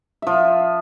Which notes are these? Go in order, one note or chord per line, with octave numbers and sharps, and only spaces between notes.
F3 E5